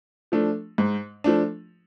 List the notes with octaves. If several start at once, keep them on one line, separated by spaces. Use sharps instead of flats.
F3 A3 D4
G#2
F3 A3 D4